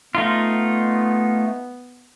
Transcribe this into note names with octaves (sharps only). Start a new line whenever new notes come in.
A3 B3 D#4 F4